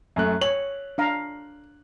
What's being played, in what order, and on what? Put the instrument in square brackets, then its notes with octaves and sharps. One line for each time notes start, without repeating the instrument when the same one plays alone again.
[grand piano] F#2 A3 F#6
[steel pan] C#5 [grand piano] F#7
[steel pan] D4 F5 A#5